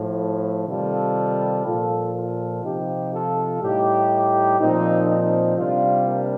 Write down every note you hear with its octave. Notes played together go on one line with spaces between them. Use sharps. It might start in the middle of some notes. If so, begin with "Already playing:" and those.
Already playing: A2 F3
C3 D#3 G3 F4 A4
A#2 F3 F4 A4
F4 A4
C3 F3 D#4 G4
F4 A4
A2 G3 D#4 G4
A#2 F3 C4 D#4
C4 D#4
C3 G3 D4 F4
A#3 D4